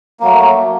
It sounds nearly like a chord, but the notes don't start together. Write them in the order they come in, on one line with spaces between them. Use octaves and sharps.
A#3 F#3 A3